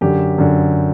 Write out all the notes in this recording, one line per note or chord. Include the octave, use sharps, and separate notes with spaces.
F#2 D3 G4
F#2 D3